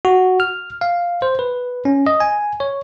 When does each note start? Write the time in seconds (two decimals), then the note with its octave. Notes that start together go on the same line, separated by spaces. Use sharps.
0.05 F#4
0.40 F6
0.81 F5
1.22 C5
1.39 B4
1.85 C#4
2.07 D#5
2.20 G#5
2.60 C#5